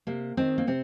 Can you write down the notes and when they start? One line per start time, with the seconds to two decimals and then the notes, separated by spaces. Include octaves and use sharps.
0.07 C3 A#3
0.37 D#3 G#3 C4
0.58 A#3
0.67 C3 C4